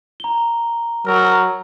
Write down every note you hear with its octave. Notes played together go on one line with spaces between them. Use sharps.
A#5 G7
F#3 A#4